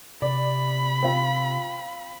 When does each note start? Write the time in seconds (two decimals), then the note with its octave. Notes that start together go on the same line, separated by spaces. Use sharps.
0.22 C3 D5 B5
1.02 C4 F4